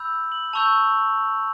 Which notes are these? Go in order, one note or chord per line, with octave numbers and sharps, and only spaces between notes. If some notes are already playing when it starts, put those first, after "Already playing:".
Already playing: B5 E6 G6
F#7
A5 C#6 E6 G6 F7